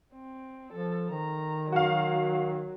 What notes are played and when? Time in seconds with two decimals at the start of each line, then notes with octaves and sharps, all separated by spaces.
0.13 C4
0.73 F3 A4
1.10 D#3 A#5
1.72 F#3 F#4 F5